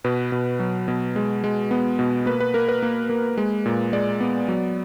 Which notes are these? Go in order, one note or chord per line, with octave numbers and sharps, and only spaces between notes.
B2 B4
B2
F#3
B2
G#3
G#3
B3
B2
A#3 B4
B4
A#3 A#4
B4
A#3
A#3
G#3
A#2
G#3 D5
B3
F#3